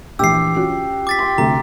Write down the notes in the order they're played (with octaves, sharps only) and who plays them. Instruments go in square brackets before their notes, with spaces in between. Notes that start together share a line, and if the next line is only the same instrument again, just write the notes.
[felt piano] A#1 E3 [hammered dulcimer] G4 [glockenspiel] E6 C7
[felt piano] C#4 F4 F#4
[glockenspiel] D6 A6 B6
[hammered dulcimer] G5 C6
[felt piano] D2 C3 [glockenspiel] A#5